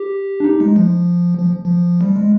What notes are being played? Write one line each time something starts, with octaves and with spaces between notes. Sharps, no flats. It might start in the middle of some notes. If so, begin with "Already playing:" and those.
Already playing: G4
D4
D#4
G#3
F3
F3
F3
G3
G#3